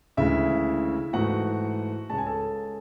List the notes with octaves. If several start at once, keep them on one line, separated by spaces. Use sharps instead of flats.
D2 C#3 E3 G#3 E4 E5
G#2 E3 A3 F#4 F#5
C#2 C#3 G#3 C#4 A5
G#5
A4 A5